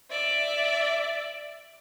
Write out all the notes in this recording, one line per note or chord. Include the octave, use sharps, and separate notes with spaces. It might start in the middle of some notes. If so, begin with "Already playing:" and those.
D5 E5